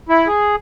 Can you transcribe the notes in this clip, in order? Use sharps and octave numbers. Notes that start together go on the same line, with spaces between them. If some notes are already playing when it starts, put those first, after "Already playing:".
E4
G#4